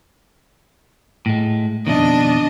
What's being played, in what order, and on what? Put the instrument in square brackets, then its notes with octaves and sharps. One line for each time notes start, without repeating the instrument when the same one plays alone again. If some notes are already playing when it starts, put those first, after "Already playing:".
[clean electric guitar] A2 G#3
[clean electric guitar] F2 B2 D#3 [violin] D4 D#5